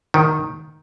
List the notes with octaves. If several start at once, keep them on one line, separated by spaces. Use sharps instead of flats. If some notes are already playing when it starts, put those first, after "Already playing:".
D#3